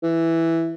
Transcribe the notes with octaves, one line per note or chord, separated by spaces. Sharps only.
E3